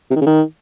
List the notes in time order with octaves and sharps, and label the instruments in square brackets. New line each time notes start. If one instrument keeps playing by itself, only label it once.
[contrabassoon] C3
D#3
C#3
D#3